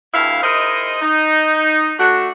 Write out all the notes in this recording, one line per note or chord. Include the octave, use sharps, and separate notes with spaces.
D2 G2 E4 F5
D#4 E4 G#4 A#4 C5 D#5
D#4
A3 D4 F#4